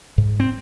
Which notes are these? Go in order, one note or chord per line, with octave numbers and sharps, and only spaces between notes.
G#2
C4